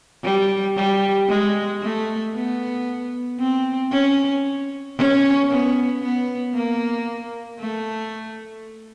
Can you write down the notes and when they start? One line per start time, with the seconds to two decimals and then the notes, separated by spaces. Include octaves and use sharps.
0.24 G3
0.76 G3
1.29 G#3
1.82 A3
2.34 B3
3.39 C4
3.92 C#4
4.97 C#4
5.49 B3
6.02 B3
6.54 A#3
7.60 A3